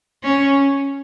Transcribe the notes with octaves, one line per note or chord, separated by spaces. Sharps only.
C#4